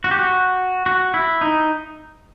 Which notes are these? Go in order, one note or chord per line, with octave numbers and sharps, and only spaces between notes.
F#4
G4
F#4
F#4
E4
D#4